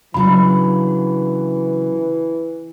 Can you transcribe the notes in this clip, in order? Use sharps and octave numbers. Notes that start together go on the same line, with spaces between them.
C#3 E3 F#3 D4 B5